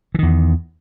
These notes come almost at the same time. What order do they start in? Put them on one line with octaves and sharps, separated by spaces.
E3 D#3 E2